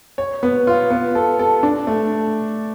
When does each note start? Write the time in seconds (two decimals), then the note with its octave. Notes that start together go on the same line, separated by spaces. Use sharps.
0.18 C#5
0.43 B3
0.67 F4
0.90 B3
1.15 A4
1.39 A4
1.63 D4
1.87 A3